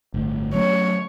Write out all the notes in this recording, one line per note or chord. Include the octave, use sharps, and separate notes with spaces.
G1 A2
F#3 A3 C#4 C#5